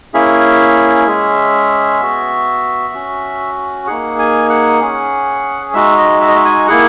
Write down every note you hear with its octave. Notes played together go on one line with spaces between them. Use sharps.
A#3 C#4 E4 G#4 E5
G#3 C#4 G#4
B3 F#4
C#4 F#4
A#3 D#4 G#4 F#5
G#5
F#5
C#4 G#4
G#3 D#4 F#4 E5
D#5
E5
D#5
E5
G#5
A#3 E4 G#4 F#5